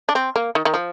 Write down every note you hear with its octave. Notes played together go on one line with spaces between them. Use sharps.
D4
C4
A#3
D#3
D#3
F3